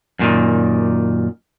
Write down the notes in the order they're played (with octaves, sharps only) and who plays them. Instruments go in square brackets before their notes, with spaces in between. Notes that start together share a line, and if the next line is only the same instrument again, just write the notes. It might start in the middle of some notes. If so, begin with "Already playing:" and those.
[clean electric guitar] F#2 A#2 D#3